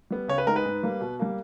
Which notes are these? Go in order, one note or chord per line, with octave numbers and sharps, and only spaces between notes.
G3 B3
C#3 C#5
B4
G#3 D#4 A#4
B4
G#2
G3 A#3
B2
G3 A#3